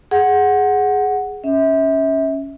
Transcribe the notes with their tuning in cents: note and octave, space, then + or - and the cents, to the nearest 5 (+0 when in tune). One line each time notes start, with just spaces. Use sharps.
G#4 +0 F#5 +0
C#4 +0 E5 -30